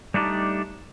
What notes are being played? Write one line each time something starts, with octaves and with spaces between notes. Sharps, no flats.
G3 A3 D4 D#4 G4